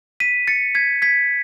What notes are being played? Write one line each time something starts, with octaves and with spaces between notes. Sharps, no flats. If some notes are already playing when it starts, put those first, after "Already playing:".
B6 D#7
A6 C#7
G#6 B6
G#6 B6